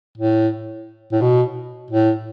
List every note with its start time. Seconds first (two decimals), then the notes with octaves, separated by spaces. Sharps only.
0.18 A2
1.12 A2
1.22 B2
1.91 A2